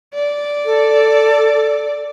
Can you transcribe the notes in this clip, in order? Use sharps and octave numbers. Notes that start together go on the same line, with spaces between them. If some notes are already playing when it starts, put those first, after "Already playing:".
D5
A4